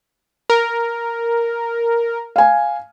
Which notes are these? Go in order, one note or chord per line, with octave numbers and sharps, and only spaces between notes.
A#4
F5 G#5